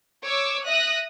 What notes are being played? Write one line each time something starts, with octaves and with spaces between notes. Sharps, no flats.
C#5 D6 E6
E5 D#6 F#6 A#6